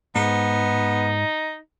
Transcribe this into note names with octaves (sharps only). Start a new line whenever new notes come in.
G#2 B3 D#4